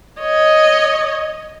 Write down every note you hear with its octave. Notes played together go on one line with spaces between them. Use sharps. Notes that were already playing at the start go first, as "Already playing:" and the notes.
C#5 D#5